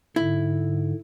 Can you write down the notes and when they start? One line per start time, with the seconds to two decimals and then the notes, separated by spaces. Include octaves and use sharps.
0.16 G#2 D3 E4